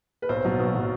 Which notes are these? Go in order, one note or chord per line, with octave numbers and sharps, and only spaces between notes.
B4
B1 C5
B2 F#3
B1 B4
B2 F#3